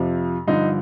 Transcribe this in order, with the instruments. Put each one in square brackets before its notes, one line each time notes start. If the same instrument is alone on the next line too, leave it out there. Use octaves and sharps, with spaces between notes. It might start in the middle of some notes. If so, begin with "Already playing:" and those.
Already playing: [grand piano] F2 C3 F3
G2 D3 F3 D#4